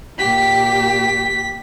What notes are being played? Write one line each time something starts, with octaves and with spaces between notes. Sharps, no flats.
A#2 G4 B6